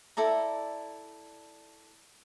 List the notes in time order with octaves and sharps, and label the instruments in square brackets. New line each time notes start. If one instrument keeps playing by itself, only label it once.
[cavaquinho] E4 A4 D5 A#5